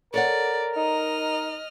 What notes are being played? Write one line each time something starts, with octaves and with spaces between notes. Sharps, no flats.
A4 A#4 C#5 D5 F#5
D#4 D#5 F6